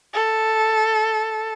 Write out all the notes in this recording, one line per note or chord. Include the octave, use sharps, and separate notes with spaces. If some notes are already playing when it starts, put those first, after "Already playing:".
A4